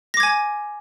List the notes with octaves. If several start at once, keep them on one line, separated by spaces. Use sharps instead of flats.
G#5 D6 G#6 A#6